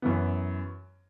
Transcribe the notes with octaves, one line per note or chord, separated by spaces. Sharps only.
F#2 E3 B3